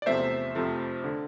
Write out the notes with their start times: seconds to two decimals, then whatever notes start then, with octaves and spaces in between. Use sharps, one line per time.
0.02 D5
0.06 E2 C3 F3 A3 C5 E5
0.55 F2 C3 F3 A3
1.04 D3